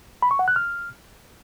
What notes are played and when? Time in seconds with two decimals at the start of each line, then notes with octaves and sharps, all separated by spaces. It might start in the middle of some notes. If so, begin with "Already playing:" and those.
0.22 B5
0.31 C#6
0.39 F#5
0.48 F#6
0.56 F6